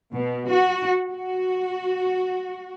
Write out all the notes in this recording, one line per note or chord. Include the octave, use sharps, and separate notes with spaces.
B2
F#4
F#4